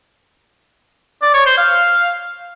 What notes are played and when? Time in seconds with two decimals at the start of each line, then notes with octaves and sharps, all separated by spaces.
1.22 D5
1.34 C#5
1.46 C5
1.58 F5